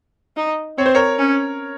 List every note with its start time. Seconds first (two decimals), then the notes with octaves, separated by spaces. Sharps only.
0.37 D#4
0.78 C4 C#5
0.86 C5
0.95 A#4 C#5
1.19 C#4